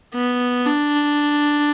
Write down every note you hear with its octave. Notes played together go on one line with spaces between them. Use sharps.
B3
D4